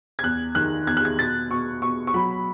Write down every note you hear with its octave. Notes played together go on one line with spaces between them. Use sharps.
G#6
E2 F#6
D#3 F#6
E2 G#6
F#6
G#6
B2 A6
B2 C#6
B2 C#6
C#6
F#3 B5